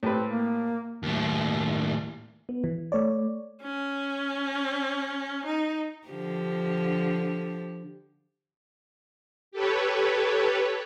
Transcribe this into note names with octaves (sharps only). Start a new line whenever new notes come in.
A2 C4 G4 B4
A#3
D#2 A2
B3
E3
A3 C#5 D5
C#4
D#4
D3 F3 G4
G4 A4 B4 C#5